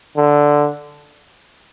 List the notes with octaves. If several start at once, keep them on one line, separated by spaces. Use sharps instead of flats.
D3